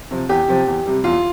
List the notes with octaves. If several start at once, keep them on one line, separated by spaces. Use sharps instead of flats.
C3 F3
E2 G4
C3 F3
E2
C3 G3
E2 F4